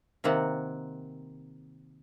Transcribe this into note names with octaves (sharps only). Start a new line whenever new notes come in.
C3 D#3 A#3 C4 F#5